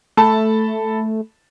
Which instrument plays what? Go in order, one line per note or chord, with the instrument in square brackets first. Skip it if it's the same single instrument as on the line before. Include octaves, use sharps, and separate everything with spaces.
[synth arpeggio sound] A3 [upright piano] A4 A5 B5